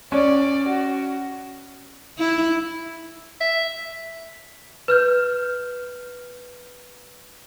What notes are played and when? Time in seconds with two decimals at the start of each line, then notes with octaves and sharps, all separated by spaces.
0.12 C#4 D5
0.69 F#4
2.19 E4
3.41 E5
4.88 B4 F6 G6